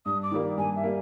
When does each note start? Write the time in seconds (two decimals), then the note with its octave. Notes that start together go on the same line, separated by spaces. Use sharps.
0.05 G2 D#6
0.23 D6
0.31 D#3 G3 A#3
0.58 G2 G#5
0.75 E5
0.84 G3 A#3